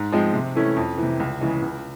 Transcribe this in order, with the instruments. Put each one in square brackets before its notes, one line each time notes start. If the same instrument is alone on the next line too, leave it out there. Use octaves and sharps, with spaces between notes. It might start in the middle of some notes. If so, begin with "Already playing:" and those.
Already playing: [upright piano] G#2
F3 G#3 C4
C3
E3 A3 C#4 E4
F2
E3
C3
C#2
C#3 E3 G#3
C#2